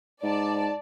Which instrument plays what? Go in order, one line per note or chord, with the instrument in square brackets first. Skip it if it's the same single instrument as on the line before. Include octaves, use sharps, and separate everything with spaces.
[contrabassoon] G#2 [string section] D5 A5